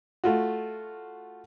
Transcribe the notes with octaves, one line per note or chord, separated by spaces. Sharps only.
A3 F4 F#4